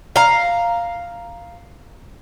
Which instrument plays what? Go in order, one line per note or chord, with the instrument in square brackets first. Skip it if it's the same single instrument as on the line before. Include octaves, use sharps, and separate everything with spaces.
[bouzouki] F5 A#5